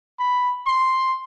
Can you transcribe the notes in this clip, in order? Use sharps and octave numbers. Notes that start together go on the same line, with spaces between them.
B5
C6